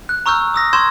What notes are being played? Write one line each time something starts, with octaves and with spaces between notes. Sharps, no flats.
F#6
A#5 C#6 E6 F6 G6
D#6 E6 A#6
C6 C#6 E6 G6 G#6 E7